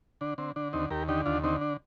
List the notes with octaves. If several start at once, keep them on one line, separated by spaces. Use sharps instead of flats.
D3 D4
D3 C4
D3 D4
D#2 C4 D#4
D#2 G4 A#4
D3 D#4 G4
D#2 D4 F4
D3 C4 D#4
D4